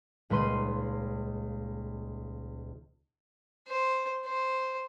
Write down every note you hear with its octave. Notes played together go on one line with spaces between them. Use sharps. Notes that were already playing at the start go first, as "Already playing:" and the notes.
D#1 C#2 B4 C6 D#7
C5
C5